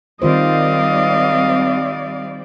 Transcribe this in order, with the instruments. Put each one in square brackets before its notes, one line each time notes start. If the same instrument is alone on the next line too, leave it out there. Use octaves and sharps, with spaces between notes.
[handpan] D#3 F4 C5 [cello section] G3 C4 D5 [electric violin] D#5 F5